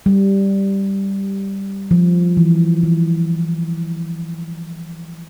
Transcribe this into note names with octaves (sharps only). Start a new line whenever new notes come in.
G3
F3
E3
E3